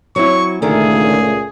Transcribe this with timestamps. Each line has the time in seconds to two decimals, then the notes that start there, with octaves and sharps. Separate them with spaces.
0.16 F#3 C4 E4 C#6
0.62 C#2 A#2 D3 D#3 A3 G#4